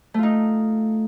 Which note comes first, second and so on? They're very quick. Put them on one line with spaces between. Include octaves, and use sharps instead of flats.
A3 F4 D#4